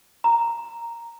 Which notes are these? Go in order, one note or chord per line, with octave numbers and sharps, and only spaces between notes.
A#5